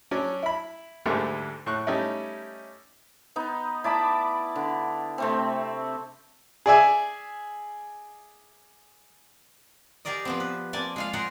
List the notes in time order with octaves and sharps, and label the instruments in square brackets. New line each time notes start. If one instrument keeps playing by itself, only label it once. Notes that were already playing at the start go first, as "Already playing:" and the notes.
[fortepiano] F#3 C#4 D4
E4 B5
D2 G#2 D3 G3 A3 A#3
A2 C#6 F#6
G3 A3 C#4 D#4 E4
[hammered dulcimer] B3 D#4
E4 D5 A5 B5
D3
C3 A3 C4
[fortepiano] G#4 D5 E5 G#5
[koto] G4 G#4 A#4 D5 D#5
F3 B3 C4
B4
A#3 C4 D5 G#5 A5
G#3 F4 F5
F4 G#4 A#4 C5 F#5